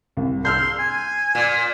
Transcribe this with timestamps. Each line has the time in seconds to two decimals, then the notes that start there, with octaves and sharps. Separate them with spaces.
0.17 C2
0.45 C6 E6 F6 G6
0.79 G#5
1.35 A#2